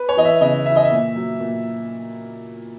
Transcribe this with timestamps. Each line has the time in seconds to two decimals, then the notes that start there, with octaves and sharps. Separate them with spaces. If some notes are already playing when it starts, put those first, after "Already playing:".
Already playing: B4
0.09 C#5
0.17 E3 D#5
0.25 E5
0.41 C#3 D#5
0.66 E3 E5
0.76 D#5
0.85 E5
0.91 A#2
1.16 F#3
1.40 A#2